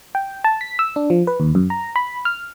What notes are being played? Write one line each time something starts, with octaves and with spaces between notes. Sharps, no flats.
G5
A5
B6
E6
D4
F3
B4
D#2
F#2
A#5
B5
F6